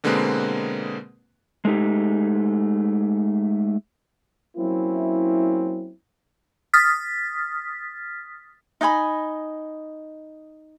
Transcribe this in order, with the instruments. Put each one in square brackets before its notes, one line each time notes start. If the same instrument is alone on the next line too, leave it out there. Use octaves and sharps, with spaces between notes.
[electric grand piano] B2 D3 G#3 A#3 C4 B4
[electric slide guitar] G#3 A3 D#4 G4
[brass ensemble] F#3 A#3 C4 C#4 E4
[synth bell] D#6 F6 A6 B6
[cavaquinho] D#4 D#5 G#5 B5